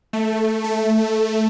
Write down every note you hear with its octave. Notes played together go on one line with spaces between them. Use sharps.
A3
A3